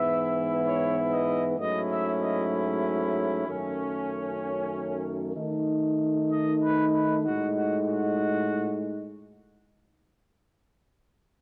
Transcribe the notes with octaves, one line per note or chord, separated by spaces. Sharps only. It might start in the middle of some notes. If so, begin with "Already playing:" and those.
Already playing: G#2 E3 B3 E4 E5
C#5
D#5
G#2 F#3 A3 C#4 E4 D#5
E5
D#5
F#2 D#3 A3 C#4
D#3 A3 D#4
D#5
B4
B4
A2 G#3 D#4 F#4
F#4
F#4